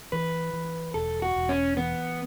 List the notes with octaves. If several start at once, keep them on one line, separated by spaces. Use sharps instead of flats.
E3 B4
E3
E1 A4
F#4
E1
C#4
E3 B3